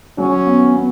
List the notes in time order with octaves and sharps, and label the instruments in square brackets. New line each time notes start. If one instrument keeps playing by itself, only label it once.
[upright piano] F#3 [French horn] C#4
[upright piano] B3
B3